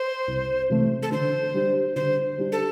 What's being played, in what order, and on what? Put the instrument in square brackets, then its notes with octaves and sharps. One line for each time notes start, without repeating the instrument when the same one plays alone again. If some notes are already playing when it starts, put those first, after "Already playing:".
Already playing: [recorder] C5
[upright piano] C2
C3 E3 A3
[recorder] A4
[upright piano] D3 [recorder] C5
[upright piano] G3 D4 G4
[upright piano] D3 [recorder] C5
[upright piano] G3 D4 G4
[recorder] A4